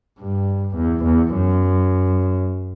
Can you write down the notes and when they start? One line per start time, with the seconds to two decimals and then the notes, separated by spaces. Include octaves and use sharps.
0.20 G2
0.77 E2
1.05 E2
1.34 F#2